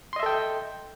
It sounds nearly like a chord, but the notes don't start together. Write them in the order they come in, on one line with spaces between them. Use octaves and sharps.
C6 D#5 E5 A4 G5